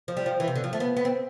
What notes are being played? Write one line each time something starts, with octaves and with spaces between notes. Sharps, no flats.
F3
G3
F3
E3
C3
D3
F3
A3
B3
B3
C4